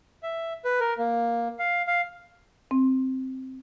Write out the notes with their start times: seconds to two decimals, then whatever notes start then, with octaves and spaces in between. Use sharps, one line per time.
0.23 E5
0.65 B4
0.80 A#4
0.98 A#3
1.59 F5
1.87 F5
2.71 C4